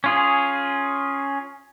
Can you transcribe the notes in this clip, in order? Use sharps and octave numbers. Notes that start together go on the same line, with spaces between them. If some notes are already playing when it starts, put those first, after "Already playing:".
C#4 F4 G#4